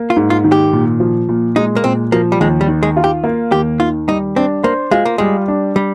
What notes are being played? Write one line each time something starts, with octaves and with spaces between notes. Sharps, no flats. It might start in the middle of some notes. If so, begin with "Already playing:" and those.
Already playing: A#3
F4
G#2
F4
D#3
G4
A#2
F3
A#2
G#3 D#4
A#3
A#2 C4
F3 A#3
G3
D#2 G#3
G3
D#3
G#3
F4
G4
A#3
D#2 G4
D#3 F4
G3 D#4
C4 D4
A#3 C5
G#3 F4
A#3
G3 G#3
D4
G3